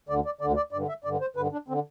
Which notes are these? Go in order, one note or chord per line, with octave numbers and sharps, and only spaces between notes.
D2 D3 D5
D5
D2 D3 D5
D5
G2 D3 D5
E5
G2 D3 D5
C5
G2 D3 B4
D4
D3 C4